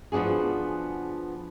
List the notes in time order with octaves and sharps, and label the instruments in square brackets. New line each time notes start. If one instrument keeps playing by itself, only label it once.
[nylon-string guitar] F3 B3 D4 F#4 G#4